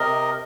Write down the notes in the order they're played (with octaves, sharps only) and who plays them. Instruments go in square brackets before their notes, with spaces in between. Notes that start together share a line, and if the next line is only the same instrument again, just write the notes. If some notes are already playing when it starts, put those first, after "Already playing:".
Already playing: [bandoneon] C3 A#4 D#5